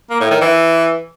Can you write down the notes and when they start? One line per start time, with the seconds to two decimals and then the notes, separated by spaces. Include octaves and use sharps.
0.10 A#3
0.20 A2
0.31 D#3
0.41 E3